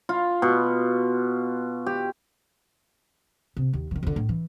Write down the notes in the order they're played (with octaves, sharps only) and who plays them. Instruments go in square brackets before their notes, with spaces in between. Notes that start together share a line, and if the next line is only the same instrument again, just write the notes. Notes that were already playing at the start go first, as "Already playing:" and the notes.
[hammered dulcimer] F4
B2
G4
[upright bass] C3
D#2
D#3 E3
F2 D3
A2
E3